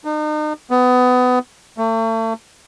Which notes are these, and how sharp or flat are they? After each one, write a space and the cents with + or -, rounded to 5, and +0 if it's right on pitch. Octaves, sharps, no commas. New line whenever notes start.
D#4 -40
B3 +25
A3 +40